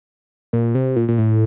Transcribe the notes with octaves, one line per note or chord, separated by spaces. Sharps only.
A#2
C3
A#2
A#2
A2